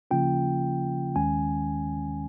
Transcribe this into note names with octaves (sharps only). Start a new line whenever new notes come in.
C#3 F3 A#3 C#4 F4 G5
D#2 D#3 G#3 C#4 G#5